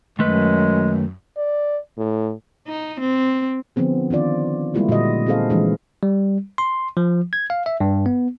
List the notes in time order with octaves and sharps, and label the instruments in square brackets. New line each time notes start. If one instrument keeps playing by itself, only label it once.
[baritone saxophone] F#2 [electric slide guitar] D#3 A3 B4 [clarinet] G#3
[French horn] D5
A2
[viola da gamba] D#4
C4
[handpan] D3 F3 B3 C4 G#4
D#3 D4 F4 D5
G3 G#3 A#3 E4 F4 G4
A#2 D3 F#4 D#5
C4 D#4 G#4 A4 C5 F5
E3 F3 G#3 D4
[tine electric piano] G3
C6
F3
G#6
F5
E5
G2
B3